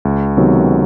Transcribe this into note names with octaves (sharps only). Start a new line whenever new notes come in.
C#2
C3 D#3 F#3 B3